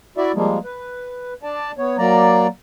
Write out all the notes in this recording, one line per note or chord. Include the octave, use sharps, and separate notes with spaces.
E4 F#4 D5 E5
F3 G3 G#3 A#3
B4
D4 D5 A5
B3 C#5
F#3 A#3 D5 A#5